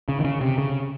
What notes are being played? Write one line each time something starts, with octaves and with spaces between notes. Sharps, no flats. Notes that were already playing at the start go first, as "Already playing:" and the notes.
C#3
D#3
C#3
C3
C#3